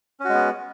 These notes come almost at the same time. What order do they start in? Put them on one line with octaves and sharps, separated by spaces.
C#4 F#4 G#3 B3